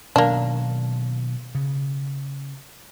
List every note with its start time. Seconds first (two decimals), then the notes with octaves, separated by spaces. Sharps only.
0.16 B2 D#3 F#3 A#3 D4
1.55 C#3